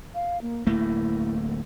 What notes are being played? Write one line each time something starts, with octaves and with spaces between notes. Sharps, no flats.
F5
A#3
D1 A3 A#3 E4